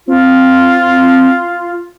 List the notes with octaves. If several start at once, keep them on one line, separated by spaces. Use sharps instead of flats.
C4 F4